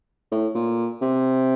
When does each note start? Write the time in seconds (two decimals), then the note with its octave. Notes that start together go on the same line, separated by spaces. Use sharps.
0.32 A2
0.55 A#2
1.02 C3